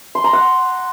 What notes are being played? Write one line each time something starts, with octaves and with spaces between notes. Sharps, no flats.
C6
A#5
F#5